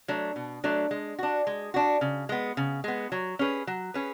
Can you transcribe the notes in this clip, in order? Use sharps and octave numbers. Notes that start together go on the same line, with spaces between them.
F#3 A3 D4
B2
F#3 A3 D4
G#3
D4 F#4
G#3
D4 F#4
C#3
G#3 B3
C#3
G#3 B3
F#3
C#4 G#4 B4
F#3
C#4 G#4 B4